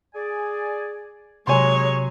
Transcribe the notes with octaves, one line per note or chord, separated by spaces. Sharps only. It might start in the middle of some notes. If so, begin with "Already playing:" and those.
G#4 D5 G#5
C3 F#3 G#3 C#5 G#5 C6